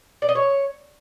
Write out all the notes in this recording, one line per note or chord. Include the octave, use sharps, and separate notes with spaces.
D5
D#5
C#5